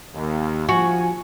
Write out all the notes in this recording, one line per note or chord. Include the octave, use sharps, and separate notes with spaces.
D#2
F3 F#4 G#5